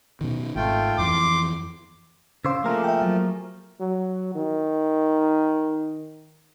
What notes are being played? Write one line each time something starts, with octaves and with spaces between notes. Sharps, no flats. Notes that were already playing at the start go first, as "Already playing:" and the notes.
B2 D#3
G#1 A3 F4 G5
F2 E3 C6 D6
C#3 C5 F5 D6 E6
F3 A3 A#3 G#4 A#4
E5 G5
F#3
F#3
D#3